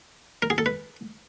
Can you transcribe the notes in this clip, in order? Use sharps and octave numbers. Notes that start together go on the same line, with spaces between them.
A#4
G#4
A4
B4